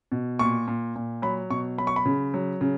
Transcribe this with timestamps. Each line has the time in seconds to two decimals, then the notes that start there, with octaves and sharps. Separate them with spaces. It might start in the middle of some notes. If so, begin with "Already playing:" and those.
0.12 B2
0.39 A#2 C#6
0.68 A#2
0.96 A#2
1.22 F#3 B5
1.50 B2 C#6
1.78 F#3 B5
1.87 C#6
1.96 B5
2.05 C#3
2.34 F#3
2.61 C#3